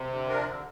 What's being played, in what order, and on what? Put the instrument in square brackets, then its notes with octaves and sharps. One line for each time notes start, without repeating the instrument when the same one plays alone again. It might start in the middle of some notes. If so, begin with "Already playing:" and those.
Already playing: [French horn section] C3
[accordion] D3
F3 D4 A#4
D3